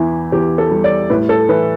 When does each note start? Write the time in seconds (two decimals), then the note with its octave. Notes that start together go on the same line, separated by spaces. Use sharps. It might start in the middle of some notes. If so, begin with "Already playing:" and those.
Already playing: E2 E3 E4
0.32 E2 G4
0.58 A4
0.71 G3
0.84 D5
1.10 A2 B4
1.29 A4
1.49 E3 B4